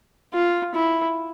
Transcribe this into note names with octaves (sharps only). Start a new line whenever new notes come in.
F4
E4